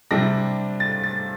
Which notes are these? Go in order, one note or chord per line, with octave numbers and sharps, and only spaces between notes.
C3 G3 D4 A#6
A6
A6